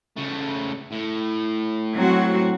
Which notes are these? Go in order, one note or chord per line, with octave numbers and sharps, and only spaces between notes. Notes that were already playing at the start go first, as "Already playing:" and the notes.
C#3 A3
A2
F#3 C4 F#4